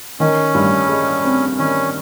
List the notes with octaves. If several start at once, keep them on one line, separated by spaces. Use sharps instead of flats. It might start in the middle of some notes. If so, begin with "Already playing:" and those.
D#3 C#4
G2
G#3
C4
D#3 C#4